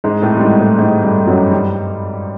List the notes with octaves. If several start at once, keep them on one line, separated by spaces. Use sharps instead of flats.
G#2 G#3
A2 A3
G3
G#2 G#3
A2 A3
G#2 G#3
G2 G3
F#2 F#3
G2 G3